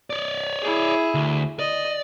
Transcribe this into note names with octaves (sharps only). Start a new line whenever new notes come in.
C#5 D5
E4 G#4
D2
D5 D#5